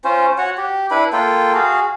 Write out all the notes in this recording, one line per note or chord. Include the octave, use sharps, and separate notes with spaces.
C#4 F4 C5
F#4 C#5 F#5
G4
D4 E4 B4 B5
A#3 F4 A4 G5
F#4 G#4 F5